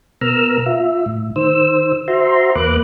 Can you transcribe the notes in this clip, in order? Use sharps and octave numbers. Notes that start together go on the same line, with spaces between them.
B2 B3 A#4 A#5 E6 F6
F4 E5
A2
D#3 C5 E6
F#4 C5 E5 A#5 C6
E2 A#3 B4 D6 F#6